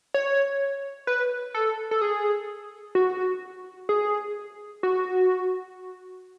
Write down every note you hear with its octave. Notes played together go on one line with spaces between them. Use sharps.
C#5
B4
A4
A4
G#4
F#4
G#4
F#4